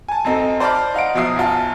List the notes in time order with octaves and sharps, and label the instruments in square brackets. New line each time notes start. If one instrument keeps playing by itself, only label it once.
[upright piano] G#5 A5
F#2 C4 D#4 A4
C5 D5 A5 B5 D6 F6
D#4 F5 F#5 D7
B2 F3 F#3 E5 D#6 C7
B1 F#2 F4 A5